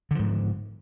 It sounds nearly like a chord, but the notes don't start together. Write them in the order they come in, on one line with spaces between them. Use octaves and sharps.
D3 F3 G#2